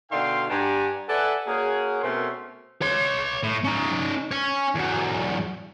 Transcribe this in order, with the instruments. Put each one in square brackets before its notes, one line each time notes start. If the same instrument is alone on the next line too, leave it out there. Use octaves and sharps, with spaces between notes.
[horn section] B2 D3 D#4 F5 G5 C6
G2 D4 G4 F#5 G#5 A#5
A4 B4 D5 E5 F#5 G#5
A#3 C#4 F#4 G#4
B2 A3 C4 C#4 A#4 C6
[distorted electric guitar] C#5 C6
A2
C#4 D#4
C#5 G#5
E2 F#3